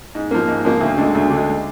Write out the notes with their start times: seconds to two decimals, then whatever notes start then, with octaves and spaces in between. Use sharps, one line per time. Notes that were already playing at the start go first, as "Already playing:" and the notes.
0.15 G#2
0.31 F3 A#3
0.48 G#2
0.65 F3 A#3
0.81 D2
0.98 D3 G#3
1.15 D2
1.30 D3 G#3